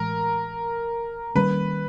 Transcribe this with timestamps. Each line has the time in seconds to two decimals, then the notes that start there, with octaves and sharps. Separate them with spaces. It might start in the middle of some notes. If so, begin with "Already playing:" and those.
Already playing: A2 E3 G#3 A#4
1.35 D#3 G3 A#3 C#4 B4